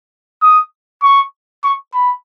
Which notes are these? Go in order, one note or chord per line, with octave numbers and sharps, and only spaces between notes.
D#6
C#6
C#6
B5